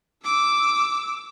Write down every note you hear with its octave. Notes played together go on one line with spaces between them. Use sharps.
D6 E6